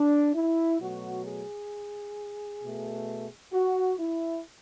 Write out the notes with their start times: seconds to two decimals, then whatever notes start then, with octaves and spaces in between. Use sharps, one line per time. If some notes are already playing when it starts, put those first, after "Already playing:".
Already playing: D4
0.35 E4
0.80 B2 F#3 A3 F#4
1.25 G#4
2.62 B2 A3
3.53 F#4
3.98 E4